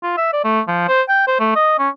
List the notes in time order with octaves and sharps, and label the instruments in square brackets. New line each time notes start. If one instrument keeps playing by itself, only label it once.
[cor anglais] F4
E5
D5
A3
F3
C5
G5
C5
A3
D#5
C#4